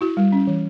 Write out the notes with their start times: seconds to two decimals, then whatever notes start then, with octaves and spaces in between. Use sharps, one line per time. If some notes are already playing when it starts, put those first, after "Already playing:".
0.01 E4 F#4
0.17 G3
0.32 C#4
0.47 E3